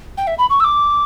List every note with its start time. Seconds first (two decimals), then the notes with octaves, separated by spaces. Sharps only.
0.18 G5
0.27 E5
0.39 B5
0.50 C#6
0.60 E6
0.64 D6